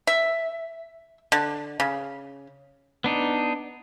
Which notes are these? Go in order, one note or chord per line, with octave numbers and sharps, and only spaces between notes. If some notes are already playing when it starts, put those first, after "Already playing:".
E5
D3
C#3
B3 D4 D#4